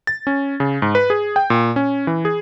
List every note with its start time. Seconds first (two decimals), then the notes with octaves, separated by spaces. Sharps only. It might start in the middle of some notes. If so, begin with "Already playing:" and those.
0.07 A6
0.27 C#4
0.60 C#3
0.82 G#2
0.95 B4
1.10 G#4
1.36 G5
1.50 A#2
1.76 C#4
2.07 E3
2.25 G#4